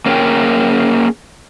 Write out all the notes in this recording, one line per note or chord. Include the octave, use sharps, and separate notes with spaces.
A#3 C#4 F4 G#4 A#4 G5